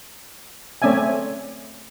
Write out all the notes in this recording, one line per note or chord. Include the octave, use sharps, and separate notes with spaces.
A3 C4 C#4 D5 E5 G#5